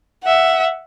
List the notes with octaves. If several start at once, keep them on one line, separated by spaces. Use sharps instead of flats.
E5 F#5